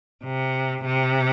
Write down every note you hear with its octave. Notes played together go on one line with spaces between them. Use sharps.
C3
C3